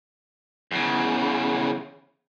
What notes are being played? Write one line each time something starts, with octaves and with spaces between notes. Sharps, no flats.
E2 C#3